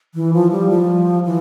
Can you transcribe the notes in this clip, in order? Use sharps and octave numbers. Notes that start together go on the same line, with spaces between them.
E3
F3
G3
F3
E3